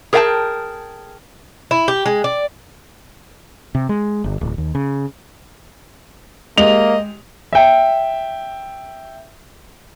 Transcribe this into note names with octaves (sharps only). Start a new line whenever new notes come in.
G#4 A#4 D5 F5 G5 A5
E4
G4
G#3
D5
C3
G#3
G1
D1
D#2
C#3
G#3 A#3 G4 D#5 F7
E5 G5